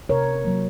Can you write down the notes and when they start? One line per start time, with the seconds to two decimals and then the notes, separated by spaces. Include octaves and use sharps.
0.09 C3 A#4 C#5
0.45 F#3 A#3